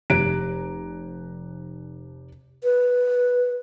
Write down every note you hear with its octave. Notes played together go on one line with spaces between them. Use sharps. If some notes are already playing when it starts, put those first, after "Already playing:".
F1 G4 A#5 F#6 G#6 D7
B4